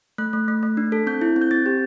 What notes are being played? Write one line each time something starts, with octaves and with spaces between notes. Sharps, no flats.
A3 F#6
A3
A3
A3
D4
A4
C4 G6
E4
C4
G6
C4 A6
G4